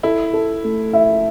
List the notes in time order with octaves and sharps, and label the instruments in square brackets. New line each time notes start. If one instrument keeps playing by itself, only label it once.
[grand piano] E4 [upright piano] A4
[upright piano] A4
A3
[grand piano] E4 [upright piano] E5